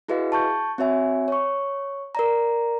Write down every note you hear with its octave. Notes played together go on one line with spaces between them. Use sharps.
E4 F#4 G#4 B4 D#5 F5
A5 C#6 G6
C4 F#4 C#5 E5 G#5
C#5 C#6
A#4 D5 A#5